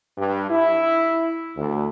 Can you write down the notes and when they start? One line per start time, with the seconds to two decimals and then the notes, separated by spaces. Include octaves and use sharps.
0.18 G2
0.50 E4
1.55 D2